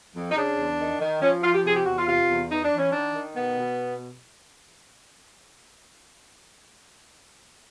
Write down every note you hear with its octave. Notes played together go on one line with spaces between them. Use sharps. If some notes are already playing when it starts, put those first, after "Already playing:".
F2
D#4
C#3 D4
E2
D#3
D#3
F3 C#4
F3 F4
G4
C3 G#4
G4
E2 F#4
F4
C3 F4
E2
E3 D#4
D4
E3
C#4
D#3 D4
D#3
B2 B3
B2